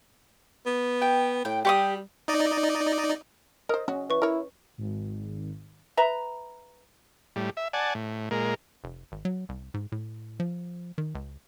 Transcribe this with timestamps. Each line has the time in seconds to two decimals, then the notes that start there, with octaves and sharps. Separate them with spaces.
0.66 B3
1.02 G5
1.45 A2 G5
1.65 G3 G4 C#6 D#6
2.28 D#4 D5 D#5
3.69 A#4 C5 D#5
3.88 C#4 F#4
4.10 E3 B4 C#6
4.22 E4 A#4 C#5
4.78 G#1
5.97 B4 E5 A#5
7.36 A2 G3
7.57 E5
7.73 D5 F#5 G#5 A5
7.95 A2
8.31 A#2 G#3 A#4
8.84 F1
9.12 G#1
9.25 F#3
9.49 C2
9.74 G#2
9.92 A2
10.40 F3
10.98 D#3
11.15 C#2